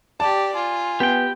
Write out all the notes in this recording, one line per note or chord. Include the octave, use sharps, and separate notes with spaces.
G4 D5 A5
F4 G#5
B3 G4 G5